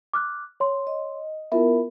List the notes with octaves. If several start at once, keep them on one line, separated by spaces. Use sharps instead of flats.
D6 F6 F#6
C#5 C6
D#5
B3 E4 F4 A#4 E5